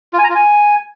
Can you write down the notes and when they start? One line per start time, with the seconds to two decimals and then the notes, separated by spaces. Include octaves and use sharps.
0.13 F4
0.19 G#5
0.24 A#5
0.29 F4
0.35 G#5